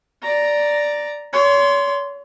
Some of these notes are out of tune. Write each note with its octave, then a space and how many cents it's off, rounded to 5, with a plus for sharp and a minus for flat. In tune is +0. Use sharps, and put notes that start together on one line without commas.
D5 +0 A#5 +0
C#5 +35 C6 -5